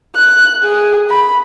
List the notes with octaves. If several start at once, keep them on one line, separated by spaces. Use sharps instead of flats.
F#6
G#4
B5